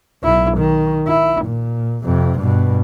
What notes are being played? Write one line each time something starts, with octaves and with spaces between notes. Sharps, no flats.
B1 E4
D#3
E4
A#2
F2 C3
G2 B2